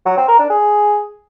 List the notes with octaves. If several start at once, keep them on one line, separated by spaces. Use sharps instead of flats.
F#3
C4
A#4
D4
G#4